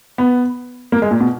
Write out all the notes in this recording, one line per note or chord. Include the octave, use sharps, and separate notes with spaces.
B3
A#3
G#3
A#2
B2